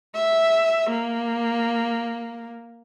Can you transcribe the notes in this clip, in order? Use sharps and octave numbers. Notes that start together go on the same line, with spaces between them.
E5
A#3